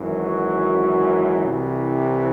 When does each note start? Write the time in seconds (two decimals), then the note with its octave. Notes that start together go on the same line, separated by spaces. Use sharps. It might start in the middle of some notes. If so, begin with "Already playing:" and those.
Already playing: G#1 F#2 E3
0.18 F#4
1.43 C2 C3 E3